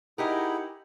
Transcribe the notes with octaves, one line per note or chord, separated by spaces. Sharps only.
D#4 E4 G4 G#4 A#4 F#5